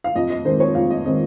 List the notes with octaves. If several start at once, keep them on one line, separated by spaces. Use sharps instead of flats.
F5
F2 D#5
D#5
D#3 G#3 C4 C5
C#5
F2 F5
D#5
D#3 G#3 C4 D#5